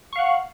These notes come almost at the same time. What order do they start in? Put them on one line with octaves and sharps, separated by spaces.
C#6 F5 F#5